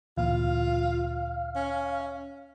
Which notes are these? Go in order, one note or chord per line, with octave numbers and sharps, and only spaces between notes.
D2 A#2 E3 F4 F5
C#4